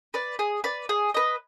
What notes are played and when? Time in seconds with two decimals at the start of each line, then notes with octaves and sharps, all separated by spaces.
0.14 B4 D5
0.39 G#4
0.64 B4 D5
0.89 G#4
1.14 B4 D#5